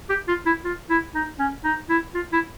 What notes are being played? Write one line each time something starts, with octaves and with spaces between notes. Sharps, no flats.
G4
F4
E4
F4
E4
D#4
C#4
D#4
E4
F4
E4